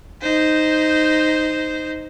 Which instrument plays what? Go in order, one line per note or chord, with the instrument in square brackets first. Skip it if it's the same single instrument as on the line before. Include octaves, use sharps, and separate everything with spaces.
[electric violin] D#4 C5